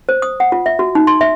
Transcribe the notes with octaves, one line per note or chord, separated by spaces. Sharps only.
C5
D#6
F#5
F4
E5
F#4
D#4
C6
E5